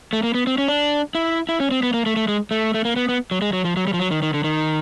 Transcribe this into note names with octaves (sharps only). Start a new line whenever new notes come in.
A3
A#3
B3
C4
C#4
D4
E4
E4
C#4
C4
B3
A#3
A3
A3
G#3
A3
A3
A#3
B3
B3
F#3
G#3
F#3
F3
F#3
G3
F3
F#3
D#3
D#3
D3
D#3